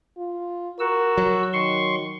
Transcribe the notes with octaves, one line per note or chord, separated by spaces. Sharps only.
F4
F#4 A#4 E6
F#3
D#3 C6 C#6